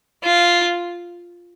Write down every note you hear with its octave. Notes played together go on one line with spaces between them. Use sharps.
F4